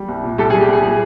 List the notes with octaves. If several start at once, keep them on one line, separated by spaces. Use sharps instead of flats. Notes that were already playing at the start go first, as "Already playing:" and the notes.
Already playing: G3
C2
A#2
C2 G4 A4
G#4
G3
G4
C2 G#4
A#2 G#4